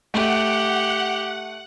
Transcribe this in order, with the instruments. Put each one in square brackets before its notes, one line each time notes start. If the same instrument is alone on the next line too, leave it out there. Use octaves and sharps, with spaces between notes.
[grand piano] A3 [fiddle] G4 [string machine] F#5